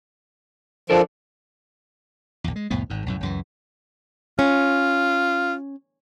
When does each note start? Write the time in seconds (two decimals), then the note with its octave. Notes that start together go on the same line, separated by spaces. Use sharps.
0.90 F3 D4 A4 A#4
2.44 A#1 E2
2.56 G#3
2.70 C2 F2 A2 B3
2.90 G#1 G#2
3.06 B1 F#2 A2
3.21 C#2 F#2 E3
4.39 C#4 F4